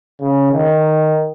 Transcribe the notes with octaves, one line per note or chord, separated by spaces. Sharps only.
C#3
D#3